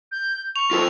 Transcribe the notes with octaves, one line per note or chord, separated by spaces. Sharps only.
G6
C#6 F7
F4 A4 C5